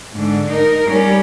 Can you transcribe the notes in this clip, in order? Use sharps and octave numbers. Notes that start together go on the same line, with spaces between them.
G#2 D3
D#4 A#4
G3 C#4